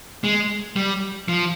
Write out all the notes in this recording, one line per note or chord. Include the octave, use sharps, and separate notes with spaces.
G#3
G3
F3